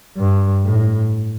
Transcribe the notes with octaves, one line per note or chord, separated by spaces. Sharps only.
G2
A2